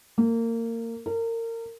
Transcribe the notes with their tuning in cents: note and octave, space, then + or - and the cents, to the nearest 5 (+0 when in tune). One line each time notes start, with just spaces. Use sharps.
A#3 -25
A#4 -30